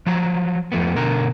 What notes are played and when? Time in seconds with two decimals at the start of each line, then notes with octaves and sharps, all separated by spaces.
0.06 F3 F#3 A#5
0.72 F2 F3 A3 B3
0.96 B2 D3 A#4